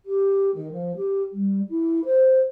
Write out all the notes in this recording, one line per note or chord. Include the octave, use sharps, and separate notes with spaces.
G4
D#3
F3
G4
G3
E4
C5